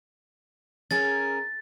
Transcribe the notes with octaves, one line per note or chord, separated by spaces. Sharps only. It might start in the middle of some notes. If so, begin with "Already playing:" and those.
C#4 G#4 A#4 A6